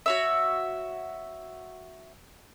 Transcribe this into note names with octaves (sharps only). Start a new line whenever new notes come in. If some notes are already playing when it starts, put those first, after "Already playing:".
F#4 C#5 E5